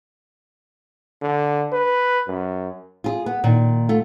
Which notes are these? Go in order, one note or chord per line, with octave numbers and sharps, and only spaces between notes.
D3
B4
F#2
F4 G#4
B3
A#2 D#3
A3 F4